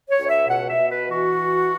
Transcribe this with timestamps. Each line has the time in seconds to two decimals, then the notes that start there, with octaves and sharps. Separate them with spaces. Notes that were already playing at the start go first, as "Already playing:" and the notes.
0.09 C#5
0.19 C#2
0.29 E5
0.49 B2 F#5
0.69 E5
0.79 B2
0.89 B4
1.09 E3 F#4